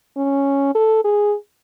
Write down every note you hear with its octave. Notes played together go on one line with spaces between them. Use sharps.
C#4
A4
G#4